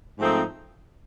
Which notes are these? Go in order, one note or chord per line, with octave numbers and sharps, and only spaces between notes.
G#2 F3 A3 C4 D#4